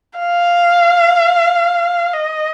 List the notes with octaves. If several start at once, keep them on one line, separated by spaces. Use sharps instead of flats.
F5
D#5